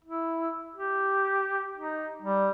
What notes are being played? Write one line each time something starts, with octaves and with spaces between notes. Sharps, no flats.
E4
G4
D#4
G3